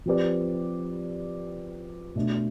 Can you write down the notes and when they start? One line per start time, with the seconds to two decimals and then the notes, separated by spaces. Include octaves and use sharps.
0.06 F3 C4 G4 B4 D5
2.15 B2 A3 D4